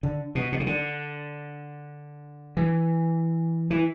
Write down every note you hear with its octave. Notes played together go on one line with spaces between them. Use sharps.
D3
B2
B2
C#3
D3
E3
E3